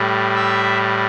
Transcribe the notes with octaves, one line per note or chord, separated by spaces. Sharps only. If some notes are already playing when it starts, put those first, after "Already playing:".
Already playing: A2 G3
E5